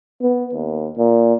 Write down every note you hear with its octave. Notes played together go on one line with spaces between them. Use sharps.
B3
D#2
A#2